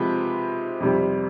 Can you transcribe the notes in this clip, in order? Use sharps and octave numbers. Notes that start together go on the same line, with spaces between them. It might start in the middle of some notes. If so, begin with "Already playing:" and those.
Already playing: C3 F3 G#3 G4 B4
F2 C3 G3